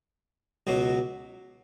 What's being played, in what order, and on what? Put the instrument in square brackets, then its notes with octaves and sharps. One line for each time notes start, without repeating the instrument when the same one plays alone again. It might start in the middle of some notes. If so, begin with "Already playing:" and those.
[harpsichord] C#2 B2 F#3